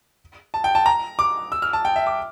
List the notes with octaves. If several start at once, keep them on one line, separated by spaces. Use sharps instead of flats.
A5
G5
A5
A#5
D6
E6
F6
A5
G5
E5
D6